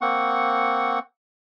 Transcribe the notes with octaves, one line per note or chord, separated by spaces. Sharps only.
A#3 C4 F#5 C#6